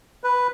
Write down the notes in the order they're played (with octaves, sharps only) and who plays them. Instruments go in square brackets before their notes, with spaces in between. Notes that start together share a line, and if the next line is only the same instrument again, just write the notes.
[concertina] B4